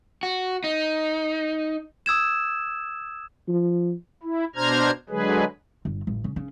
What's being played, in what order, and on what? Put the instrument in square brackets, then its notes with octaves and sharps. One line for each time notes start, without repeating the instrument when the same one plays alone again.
[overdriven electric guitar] F#4
D#4
[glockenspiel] D#6 E6 G#6 E7
[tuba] F3
[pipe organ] E4
B2 D4 C5 A#5 F6 G#6
D3 F#3 G#3 G#4 B4
[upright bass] G1
A1
C#3
C#3